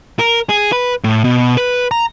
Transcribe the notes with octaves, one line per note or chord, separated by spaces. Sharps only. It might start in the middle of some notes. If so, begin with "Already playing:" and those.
A#4
G#4
B4
A2
B2
B4
A#5